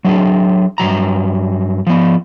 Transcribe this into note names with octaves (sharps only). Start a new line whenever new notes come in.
F#3 D4 G#4
G2 C3 F#3 A#5
F3 B3